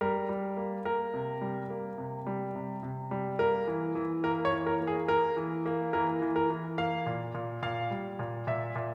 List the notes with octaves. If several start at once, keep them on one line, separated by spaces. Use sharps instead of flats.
G3 A#4
G3
A#3
A#3 A#4
C3
G3
A#3
C3
G3
C3
C3
G3
A#3 A#4
E3
E3
A#3 A#4
C#5
E3
A#4
A#3
G#4
A#3 A#4
E3
A#3
E3 A#4
E3
A#4
E3
A#3 F5
A#2
A#2
A#2 F5
G3
A#2
A#2 E5
A#2